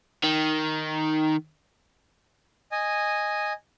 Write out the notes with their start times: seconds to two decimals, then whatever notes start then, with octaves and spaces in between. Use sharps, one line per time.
0.24 D#3
2.72 D#5 G#5